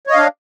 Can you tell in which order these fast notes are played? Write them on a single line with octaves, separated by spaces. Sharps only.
C#5 D#5 F5 D4